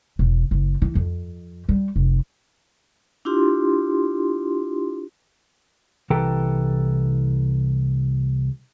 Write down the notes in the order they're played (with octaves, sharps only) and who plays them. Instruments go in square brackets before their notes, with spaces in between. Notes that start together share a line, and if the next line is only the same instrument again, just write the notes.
[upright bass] E1
F#1
E3
F2
G3
F1
[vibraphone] D4 E4 F4 G4 C6
[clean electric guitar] C2 E3 A4 B4 G5 A#5